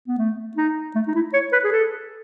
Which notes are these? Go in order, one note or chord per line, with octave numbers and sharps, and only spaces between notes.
B3
A3
D#4
A3
D#4
E4
C#5
B4
G#4
A4